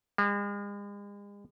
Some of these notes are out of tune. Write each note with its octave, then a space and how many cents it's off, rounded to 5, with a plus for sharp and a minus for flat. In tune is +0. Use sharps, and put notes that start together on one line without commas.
G#3 -40